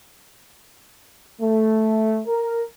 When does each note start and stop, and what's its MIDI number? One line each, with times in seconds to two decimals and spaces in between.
1.41 2.20 57
2.28 2.64 70